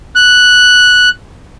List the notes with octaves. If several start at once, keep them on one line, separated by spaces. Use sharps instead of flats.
F#6